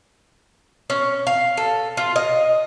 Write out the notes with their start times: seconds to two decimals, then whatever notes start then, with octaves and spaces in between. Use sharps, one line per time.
0.90 C#4
1.27 F5
1.57 A4
1.97 F4
2.16 D#5